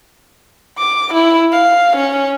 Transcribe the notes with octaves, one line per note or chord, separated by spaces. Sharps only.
D6
E4
F5
C#4